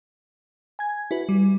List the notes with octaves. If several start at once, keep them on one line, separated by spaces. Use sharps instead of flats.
G#5 G#6
E4 F#4 B4
G3